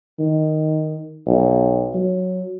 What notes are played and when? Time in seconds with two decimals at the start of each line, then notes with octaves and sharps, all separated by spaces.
0.19 D#3
1.27 B1
1.94 F#3